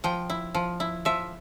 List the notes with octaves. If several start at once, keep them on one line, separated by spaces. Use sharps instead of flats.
F3 G5
E4
F3
E4
F3 E5